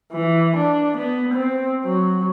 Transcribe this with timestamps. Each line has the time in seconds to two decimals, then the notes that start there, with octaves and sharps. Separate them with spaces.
0.12 E3
0.57 D4
0.98 B3
1.34 C4
1.85 F#3